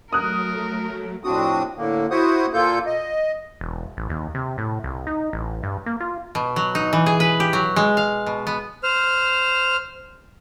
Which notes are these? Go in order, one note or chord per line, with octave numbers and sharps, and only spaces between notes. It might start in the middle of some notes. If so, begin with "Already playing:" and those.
F#3 A3 A#4 D#6 F#6
F2 A2 C4 D4 F#4 D#6
A2 D3 A#3
E4 F#4 C5 F#5 D#6
A#2 A#3 F4 A4 G6
D#5
E1
A1
D#2
C3
A2
C2
D#4
A1
G2
A#3
F4
B2
F#3
D#4
E3
G#4
B4
G4
F#3
G#3
F5
B2
B3
C5 F6